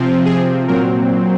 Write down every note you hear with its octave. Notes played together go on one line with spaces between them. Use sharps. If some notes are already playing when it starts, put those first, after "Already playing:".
Already playing: C3 F3 C4
G#4
A#2 F#3 C4 A#4